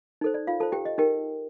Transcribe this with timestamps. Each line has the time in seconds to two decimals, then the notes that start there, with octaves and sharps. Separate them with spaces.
0.21 D#4 A4 C5
0.34 D5
0.47 F4 F5
0.60 F4 A4 C5 A5
0.72 G4 G5
0.85 D#5
0.98 D#4 G4 A#4 G5